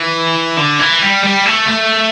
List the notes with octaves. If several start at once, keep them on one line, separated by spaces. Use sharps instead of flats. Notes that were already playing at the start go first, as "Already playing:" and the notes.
Already playing: E3
D3
E3
G3
G3
A3
A3